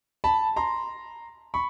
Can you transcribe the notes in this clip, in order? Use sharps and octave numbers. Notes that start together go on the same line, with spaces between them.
A5 B5
A#5 C6
B5 C#6